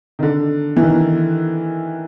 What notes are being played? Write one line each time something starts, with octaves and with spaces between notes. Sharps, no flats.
D#3
D3
E3
D#3